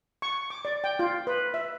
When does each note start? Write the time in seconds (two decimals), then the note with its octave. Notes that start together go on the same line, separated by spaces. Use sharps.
0.22 C#6
0.50 D6
0.65 D5
0.84 G5
0.99 F4
1.27 B4
1.54 E5